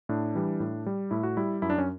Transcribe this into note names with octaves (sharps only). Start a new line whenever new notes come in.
A2 D4
E3 G3
A2
G3
A2 E4
F#4
G3 E4
F#2 E4
D4
C#4